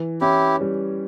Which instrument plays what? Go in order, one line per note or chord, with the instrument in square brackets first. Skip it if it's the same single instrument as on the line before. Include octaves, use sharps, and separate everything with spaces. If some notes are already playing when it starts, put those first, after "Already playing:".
Already playing: [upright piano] E3
[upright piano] C#4 [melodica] E4 G4
[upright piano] G3